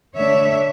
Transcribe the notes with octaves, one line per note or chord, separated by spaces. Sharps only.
D3 A3 D4 C#5 E5